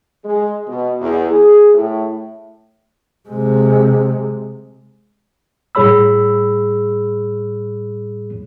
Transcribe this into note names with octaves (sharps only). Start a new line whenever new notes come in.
G#3
B2
E2
G#4
A2
C3 G#3
A2 G3 G#4 C#5 B5 E6